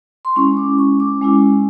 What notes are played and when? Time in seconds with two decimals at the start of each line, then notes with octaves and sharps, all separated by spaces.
0.25 C6
0.36 G#3 C#4 E4 C#6
0.57 D6
0.78 C#6
1.00 D6
1.21 G#3 C#4 E4